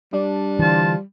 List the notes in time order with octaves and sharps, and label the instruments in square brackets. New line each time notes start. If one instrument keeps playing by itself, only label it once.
[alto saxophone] G3 [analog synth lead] D4
[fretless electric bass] D3 E3 [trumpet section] F4 C5 A5